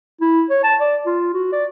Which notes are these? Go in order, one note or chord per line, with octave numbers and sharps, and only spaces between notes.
E4
C#5
A5
D5
F4
F#4
D5